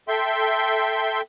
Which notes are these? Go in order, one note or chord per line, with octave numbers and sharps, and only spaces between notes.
A4 E5 G5 C6